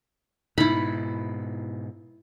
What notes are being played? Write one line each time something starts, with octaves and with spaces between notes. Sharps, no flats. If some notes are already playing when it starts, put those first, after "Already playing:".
G#2 B2 D#4 E4 B5